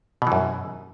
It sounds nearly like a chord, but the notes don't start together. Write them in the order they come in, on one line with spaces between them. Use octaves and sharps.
B2 E3 F#2